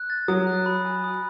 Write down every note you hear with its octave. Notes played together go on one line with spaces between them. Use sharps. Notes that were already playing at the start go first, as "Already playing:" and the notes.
Already playing: F#6
A6
F#3 D#6
F#6
B5
G#5
D#6